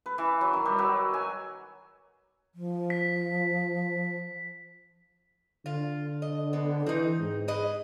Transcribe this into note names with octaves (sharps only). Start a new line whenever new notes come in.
B4
E3
F#3
D#3
G3
F#3
G#5
F3
B6
D3 F4
D#5
B3 C4
E3 C4 D#4
G#2
G#4 B4 D#5